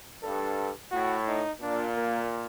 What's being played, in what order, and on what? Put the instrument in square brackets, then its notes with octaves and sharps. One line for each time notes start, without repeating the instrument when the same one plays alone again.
[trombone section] G2 [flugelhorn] A4
[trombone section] A2 [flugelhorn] F#4
[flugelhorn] D#4
[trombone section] A#2 [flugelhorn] D4
[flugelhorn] A#3